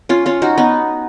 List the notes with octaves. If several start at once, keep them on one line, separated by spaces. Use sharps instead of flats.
C#4 F4
C#4 F4
D#4 F#4
B3 D#4